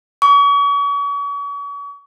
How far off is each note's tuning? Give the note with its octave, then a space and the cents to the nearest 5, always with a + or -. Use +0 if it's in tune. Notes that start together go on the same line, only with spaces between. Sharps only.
C#6 +40